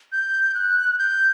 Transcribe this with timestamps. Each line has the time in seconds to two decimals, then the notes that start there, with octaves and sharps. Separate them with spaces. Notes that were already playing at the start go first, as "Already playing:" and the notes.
0.12 G6
0.55 F#6
0.99 G6